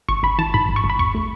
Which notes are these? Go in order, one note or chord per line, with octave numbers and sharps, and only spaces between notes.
G#1 C#6
G#1 B5
E3 A5
G#2 B5
G#1
C#6
G#1
B5
E2 C#6
A3